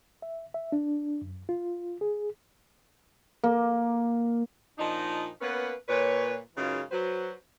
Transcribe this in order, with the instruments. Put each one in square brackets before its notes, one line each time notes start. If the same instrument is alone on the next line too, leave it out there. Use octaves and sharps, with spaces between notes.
[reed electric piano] E5
E5
D4
F#2
F4
G#4
[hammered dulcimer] A#3
[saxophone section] A#2 F3 D4 D#4
A#3 B3 C#4 B4
A#2 B4 C#5
F#2 C#3 E3 G#3 D#4 F4
F#3 B4 C5